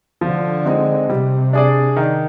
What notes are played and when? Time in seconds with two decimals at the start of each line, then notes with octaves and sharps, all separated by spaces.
0.21 D3 F3
0.66 G#3 C4 D#4
1.09 C3 G3
1.53 D4 G#4 D5
1.96 D#3